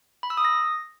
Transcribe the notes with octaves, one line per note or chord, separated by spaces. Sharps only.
B5
E6
D#6
A#6